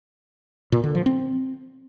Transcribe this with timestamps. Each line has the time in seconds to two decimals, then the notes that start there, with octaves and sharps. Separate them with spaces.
0.72 A#2
0.84 D3
0.95 F3
1.06 C4